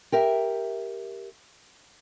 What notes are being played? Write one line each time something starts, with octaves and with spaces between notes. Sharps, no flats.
G4 A#4 E5